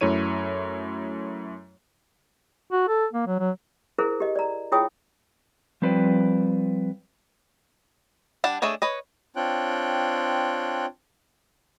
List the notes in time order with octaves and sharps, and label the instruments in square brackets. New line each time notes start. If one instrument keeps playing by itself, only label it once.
[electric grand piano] F#2 A3 E4 C#5 D#7
[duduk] F#4
A4
A#3
F#3
F#3
[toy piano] E4 G#4 A#4 C5
G4 D#5
D5 A#5
E4 F4 G#4 C#5 G5 D#6
[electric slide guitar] F3 G3 C4 B4 C5 D5
[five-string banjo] G3 D4 F#5 A5
A3 D4 G#4 C#5 D#5
B4 C#5 D#5
[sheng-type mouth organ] C4 D4 F4 C#5 G5 F#6